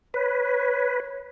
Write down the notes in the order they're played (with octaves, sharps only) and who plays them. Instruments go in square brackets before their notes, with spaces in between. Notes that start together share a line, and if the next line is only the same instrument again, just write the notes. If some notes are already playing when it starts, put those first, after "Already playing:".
[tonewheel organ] B4 [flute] C#5